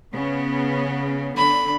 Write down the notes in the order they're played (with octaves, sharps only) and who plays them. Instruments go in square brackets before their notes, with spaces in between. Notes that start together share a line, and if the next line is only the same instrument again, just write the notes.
[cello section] C#3 B3 C#4
[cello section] D3 [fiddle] B5